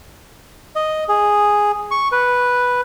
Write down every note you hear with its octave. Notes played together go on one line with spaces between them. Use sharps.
D#5
G#4
C#6
B4